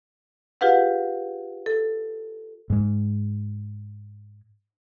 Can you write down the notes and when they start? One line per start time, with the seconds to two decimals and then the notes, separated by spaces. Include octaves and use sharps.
0.61 F4 G4 G#4 B4 F5 F#5
1.66 A4
2.70 G#2 G#3